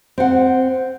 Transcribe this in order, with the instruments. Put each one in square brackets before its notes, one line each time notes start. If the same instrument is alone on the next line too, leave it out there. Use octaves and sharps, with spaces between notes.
[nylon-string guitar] C4 F#5